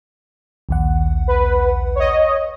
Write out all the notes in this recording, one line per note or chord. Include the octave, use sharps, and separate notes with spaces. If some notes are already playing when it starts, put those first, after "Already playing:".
A#1 D#2 F#5
B4
C#5 D#5